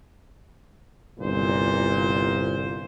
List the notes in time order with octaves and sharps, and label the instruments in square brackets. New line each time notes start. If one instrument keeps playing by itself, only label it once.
[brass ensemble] G1 C2 A#2 C5